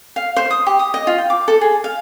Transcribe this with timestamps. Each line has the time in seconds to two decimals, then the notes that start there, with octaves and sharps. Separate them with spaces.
0.16 F5
0.36 C5
0.51 D#6
0.67 G4
0.79 D#6
0.94 D#5
1.07 F4
1.18 G5
1.30 D6
1.48 A4
1.61 G#4
1.84 F5